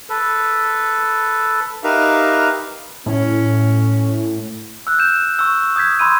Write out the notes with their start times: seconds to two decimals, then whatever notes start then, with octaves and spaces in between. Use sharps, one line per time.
0.10 A4 B4
1.84 D#4 G4 A#4 B4 E5 F5
3.06 A2 C#4
4.87 E6 F#6
4.99 G6 E7
5.39 C#6 E6
5.76 D#6 G6 G#6 B6
5.99 B5 C6 E6 D#7